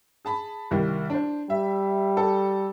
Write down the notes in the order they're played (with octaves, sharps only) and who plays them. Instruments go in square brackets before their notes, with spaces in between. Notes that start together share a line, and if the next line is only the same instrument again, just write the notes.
[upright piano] G#4 A5 B5
C2 D#3 G3
D4 C5
[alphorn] G3 [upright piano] E5
[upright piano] A4